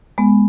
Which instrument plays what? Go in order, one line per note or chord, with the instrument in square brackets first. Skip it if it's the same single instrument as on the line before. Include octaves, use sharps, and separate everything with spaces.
[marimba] G#3 B3